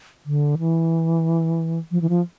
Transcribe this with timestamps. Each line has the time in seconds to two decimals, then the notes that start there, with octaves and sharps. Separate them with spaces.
0.26 D3
0.59 E3
1.91 F3
2.01 E3
2.09 F3